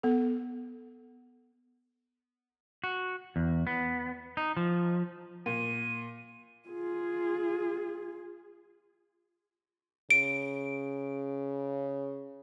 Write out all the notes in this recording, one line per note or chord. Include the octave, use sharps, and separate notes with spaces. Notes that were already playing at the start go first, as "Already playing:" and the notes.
B3 A4
F#4
E2
B3
D#4
F3
A#2 D#7
F4 G#4
C#3 D7